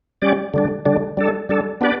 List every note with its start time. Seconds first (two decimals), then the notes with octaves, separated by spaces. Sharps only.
0.22 G3 C#4 G4 D5
0.54 D3 G3 D4
0.85 D3 G3 D4
1.17 G3 D4 A4
1.49 G3 D4 A4
1.81 B3 D4 G4 B4 D5